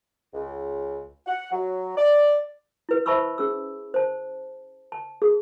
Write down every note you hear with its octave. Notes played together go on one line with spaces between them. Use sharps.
C#2
F#5
F#3
D5
E4 B4
C5 E5 A5 B5 C#6 E6
C#4 G#4 E6
C5 A5
A5
G#4